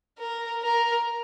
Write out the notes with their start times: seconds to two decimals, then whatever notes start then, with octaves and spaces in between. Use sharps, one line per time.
0.19 A#4
0.63 A#4